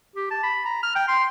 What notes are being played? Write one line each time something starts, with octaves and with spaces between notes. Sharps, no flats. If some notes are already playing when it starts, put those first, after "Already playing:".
G4
A5
B5
A#5
F6
G5
C6